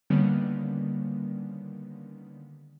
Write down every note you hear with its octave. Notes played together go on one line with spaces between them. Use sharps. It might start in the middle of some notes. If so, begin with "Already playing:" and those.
D3 D#3 G3 A#3 B3 C#4